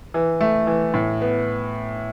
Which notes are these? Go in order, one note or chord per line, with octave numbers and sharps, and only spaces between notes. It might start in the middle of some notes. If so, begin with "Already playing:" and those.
E3
A3
E3
A2
B3